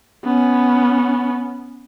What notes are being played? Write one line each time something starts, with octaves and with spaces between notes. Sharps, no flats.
B3 C#4